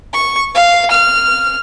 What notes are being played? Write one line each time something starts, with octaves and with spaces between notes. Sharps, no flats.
C#6
F5
F6